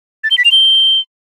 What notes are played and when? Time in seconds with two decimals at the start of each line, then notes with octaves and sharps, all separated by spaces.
0.24 A6
0.31 G7
0.38 B6
0.45 F7
0.52 G7